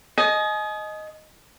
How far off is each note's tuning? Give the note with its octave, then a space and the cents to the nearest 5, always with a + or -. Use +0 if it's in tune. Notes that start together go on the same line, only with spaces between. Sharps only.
D#5 +0 G#5 +40